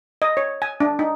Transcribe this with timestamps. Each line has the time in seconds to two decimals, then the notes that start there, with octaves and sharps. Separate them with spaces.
0.22 D#5
0.37 C#5
0.62 G#5
0.80 D4
0.99 D#4